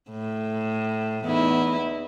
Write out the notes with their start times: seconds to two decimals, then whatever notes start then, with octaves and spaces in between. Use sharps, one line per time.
0.11 A2
1.25 E2 D#4 E4